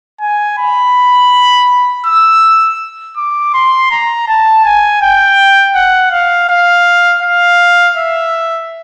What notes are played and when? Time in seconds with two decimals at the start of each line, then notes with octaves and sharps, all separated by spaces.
0.21 G#5
0.58 B5
2.06 E6
3.17 D6
3.54 C6
3.91 A#5
4.28 A5
4.64 G#5
5.02 G5
5.75 F#5
6.12 F5
6.49 F5
7.23 F5
7.97 E5